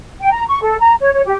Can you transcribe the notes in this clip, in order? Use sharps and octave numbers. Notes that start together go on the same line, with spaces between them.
G5
A#5
C#6
A4
A#5
C#5
C#5
G4